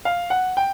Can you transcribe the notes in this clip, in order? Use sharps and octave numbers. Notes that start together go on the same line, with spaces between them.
F5
F#5
G5